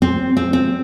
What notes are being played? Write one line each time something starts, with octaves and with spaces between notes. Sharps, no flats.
C4
C4
C4